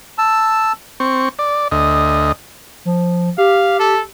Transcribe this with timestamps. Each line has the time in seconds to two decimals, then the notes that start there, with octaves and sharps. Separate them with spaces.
0.18 A5 E6
1.00 C4 C#6
1.39 D5
1.71 D2 D#5
2.85 F3
3.38 G4 F5
3.79 A4